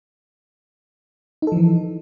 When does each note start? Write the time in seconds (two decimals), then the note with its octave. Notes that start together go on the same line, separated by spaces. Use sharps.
1.42 D#4
1.47 A4
1.52 F3
1.57 E3